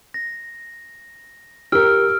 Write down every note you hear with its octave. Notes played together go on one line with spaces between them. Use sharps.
A#6
G4 A#4 E6 F6 D7